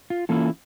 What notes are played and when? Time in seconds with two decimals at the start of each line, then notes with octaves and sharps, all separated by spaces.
0.10 F4
0.29 E3 A#3 C#4 E4 F4 A4